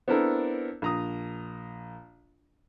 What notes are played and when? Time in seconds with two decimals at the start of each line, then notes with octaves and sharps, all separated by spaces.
0.08 B3 C4 D4 E4 A4 A#4
0.82 A#1 A#5 D#6